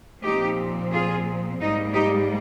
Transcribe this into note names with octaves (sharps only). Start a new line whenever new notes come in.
A#2 F3 C4 D#4 G4
F4 G#4
G#2 G3 A#3 D#4
D#4 G4